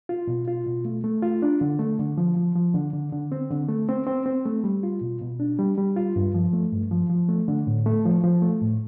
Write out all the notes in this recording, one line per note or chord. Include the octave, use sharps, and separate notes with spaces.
F4
B2
F4
B2
A3
A3
F4
D4
D3
A3
D3
F3
F3
F3
D3
D3
D3
C4
D3
A3
C4
C4
C4
A3
G3
F4
B2
B2
D4
G3
G3
F4
G2
F3
A3
G2
F3
F3
A3
D3
A2
A3
F3
F3
A3
A2